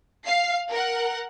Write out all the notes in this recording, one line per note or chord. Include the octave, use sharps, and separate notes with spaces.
F5 C7
A#4 F#5